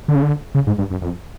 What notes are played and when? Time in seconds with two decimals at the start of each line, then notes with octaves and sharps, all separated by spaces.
0.08 D3
0.15 C#3
0.22 D3
0.55 C#3
0.67 G#2
0.78 G2
0.90 F#2
1.02 F2